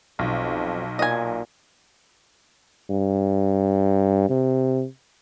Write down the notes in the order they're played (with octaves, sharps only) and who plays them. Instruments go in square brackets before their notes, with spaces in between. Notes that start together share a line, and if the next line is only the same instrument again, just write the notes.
[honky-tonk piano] B1 [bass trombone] F2
[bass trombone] A#2 [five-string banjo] D#5 G#5
[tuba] G2
C3